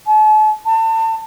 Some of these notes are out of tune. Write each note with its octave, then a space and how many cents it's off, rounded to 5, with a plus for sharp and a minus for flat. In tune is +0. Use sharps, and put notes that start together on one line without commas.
A5 -40
A5 +30